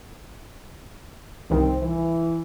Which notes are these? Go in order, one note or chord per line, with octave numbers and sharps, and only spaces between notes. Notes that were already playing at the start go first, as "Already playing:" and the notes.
C2 G2 D#3 C4
E3